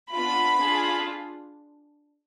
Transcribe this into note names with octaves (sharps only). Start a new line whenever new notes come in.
B3 D4 F4 B5
D4 F4 G#4